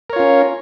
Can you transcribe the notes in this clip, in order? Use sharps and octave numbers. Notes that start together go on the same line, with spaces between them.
C#4 F4 A#4 C#5